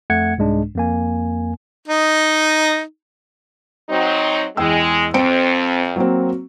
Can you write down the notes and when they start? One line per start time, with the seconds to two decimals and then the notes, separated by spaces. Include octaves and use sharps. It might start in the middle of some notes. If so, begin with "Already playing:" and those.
0.10 F2 A3 F#5 G#6 C#7
0.38 C2 G#2 G#3 D4
0.76 F2 A#3 G#5
1.88 D#4 D#5
3.89 F#3 C4 D#4
4.57 E2 G#3 G5 E6
5.14 F2 C4 C#7 D7
5.96 F#3 A#3 C4